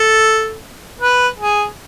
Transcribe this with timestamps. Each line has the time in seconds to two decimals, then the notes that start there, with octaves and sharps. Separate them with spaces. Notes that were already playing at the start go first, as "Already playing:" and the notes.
Already playing: A4
1.01 B4
1.39 G#4